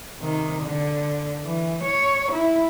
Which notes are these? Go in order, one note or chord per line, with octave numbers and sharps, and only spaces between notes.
C3 D#3
D3
E3
C#5
E4